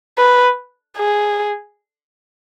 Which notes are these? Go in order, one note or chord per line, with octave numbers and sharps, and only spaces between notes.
B4
G#4